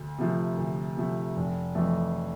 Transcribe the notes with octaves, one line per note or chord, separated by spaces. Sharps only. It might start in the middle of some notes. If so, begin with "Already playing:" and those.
Already playing: D2
C3 F3 A3
D2
C3 F3 A3
F1
F2 E3 A3